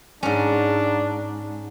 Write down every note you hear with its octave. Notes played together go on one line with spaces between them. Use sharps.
G#2 C#4 D4